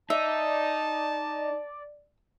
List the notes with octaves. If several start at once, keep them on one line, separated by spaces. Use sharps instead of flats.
D#4 D5 E5 A5